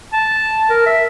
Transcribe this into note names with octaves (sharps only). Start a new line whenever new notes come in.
A5
A#4
E5